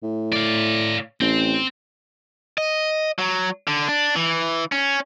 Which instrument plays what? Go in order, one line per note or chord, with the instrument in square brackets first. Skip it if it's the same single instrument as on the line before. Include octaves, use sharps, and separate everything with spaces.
[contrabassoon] A2
[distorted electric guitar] D5 F5
[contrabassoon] A1 [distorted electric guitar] C4
[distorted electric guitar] D#5
F#3
D3
D4
E3
C#4